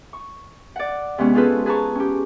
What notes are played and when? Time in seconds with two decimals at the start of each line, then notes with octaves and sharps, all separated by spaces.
0.13 C#6
0.76 D5 F#5
1.18 C3 G#3 B3 C#4
1.34 C#4 F4 G#4 A4 B4 C5
1.66 G#4 B4 A5 A#5 C#6
1.95 C#4 G4